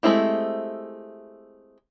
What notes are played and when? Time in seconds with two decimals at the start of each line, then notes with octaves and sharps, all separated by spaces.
0.03 G#3 A3 C4 E4 G4